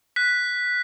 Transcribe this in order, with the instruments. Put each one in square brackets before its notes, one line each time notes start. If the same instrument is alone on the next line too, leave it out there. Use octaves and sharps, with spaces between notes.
[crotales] F#6 B6